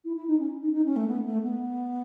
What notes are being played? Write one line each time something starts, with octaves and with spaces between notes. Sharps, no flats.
E4
E4
D#4
C#4
D#4
D#4
C#4
A3
B3
A3
B3